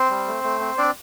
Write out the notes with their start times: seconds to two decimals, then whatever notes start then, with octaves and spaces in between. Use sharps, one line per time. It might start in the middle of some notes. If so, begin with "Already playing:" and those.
Already playing: C4 C5
0.10 G3
0.27 A3
0.44 A3
0.61 C4
0.78 C4 D4 D5